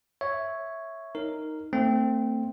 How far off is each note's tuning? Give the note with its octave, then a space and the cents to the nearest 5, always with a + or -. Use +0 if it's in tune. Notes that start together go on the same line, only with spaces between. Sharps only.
C#5 +0 E5 +0
D#4 +0 A#4 -5
A3 +35 C4 +0